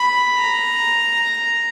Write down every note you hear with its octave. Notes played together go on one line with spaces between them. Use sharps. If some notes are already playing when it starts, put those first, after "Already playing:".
Already playing: B5
A#5